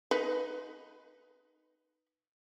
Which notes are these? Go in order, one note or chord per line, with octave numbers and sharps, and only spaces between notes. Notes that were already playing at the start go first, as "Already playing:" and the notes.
D#4 B4